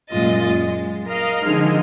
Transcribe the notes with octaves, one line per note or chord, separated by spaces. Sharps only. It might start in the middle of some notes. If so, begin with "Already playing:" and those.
F#2 A#2 G#3 F4 D#5 A6
G#3
A#4 D#5 F5 F6
D3 D#3 F3 G#3 D#4